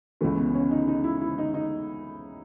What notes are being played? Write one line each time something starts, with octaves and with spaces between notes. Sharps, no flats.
C#2 C#3 E3 A3
B3
C#4
D#4
D#4
E4
E4
D#4
D#4